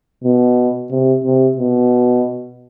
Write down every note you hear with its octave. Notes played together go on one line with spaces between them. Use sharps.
B2
C3
C3
B2